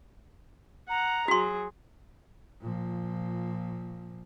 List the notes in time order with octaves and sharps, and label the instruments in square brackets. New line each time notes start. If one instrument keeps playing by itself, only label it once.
[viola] F#5 [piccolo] A#5
[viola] F#3 G#4 [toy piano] F#4 C6
[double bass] A#2 F3